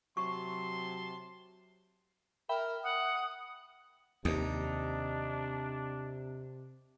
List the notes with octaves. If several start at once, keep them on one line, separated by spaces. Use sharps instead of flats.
C3 F#3 A5 C6 C#6
A#4 E5 G5 B5
F#5 D#6
D#2 C3 D4 D#4